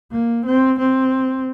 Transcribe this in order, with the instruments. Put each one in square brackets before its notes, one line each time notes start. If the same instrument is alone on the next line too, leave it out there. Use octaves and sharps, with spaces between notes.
[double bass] A#3
C4
C4